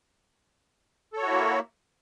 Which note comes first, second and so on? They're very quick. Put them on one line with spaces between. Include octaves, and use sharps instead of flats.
A4 C#5 F#4 E4 A#3